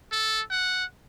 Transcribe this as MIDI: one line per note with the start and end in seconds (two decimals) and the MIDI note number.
0.12 0.42 69
0.51 0.85 78